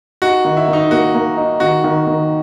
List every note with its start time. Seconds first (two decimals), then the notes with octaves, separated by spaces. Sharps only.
0.22 D#4 F#4
0.45 D#3
0.57 E4
0.68 D#3
0.73 D#4
0.91 A#3 F#4
1.14 A#3
1.37 D#4
1.60 D#3 F#4
1.84 D#3
2.07 D#3